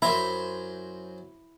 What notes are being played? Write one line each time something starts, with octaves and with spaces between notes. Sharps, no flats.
F#2 E4 C5 A#5